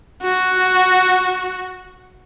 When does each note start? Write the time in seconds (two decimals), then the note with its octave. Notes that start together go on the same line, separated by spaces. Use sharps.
0.23 F#4